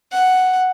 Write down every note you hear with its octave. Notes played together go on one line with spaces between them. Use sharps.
F#5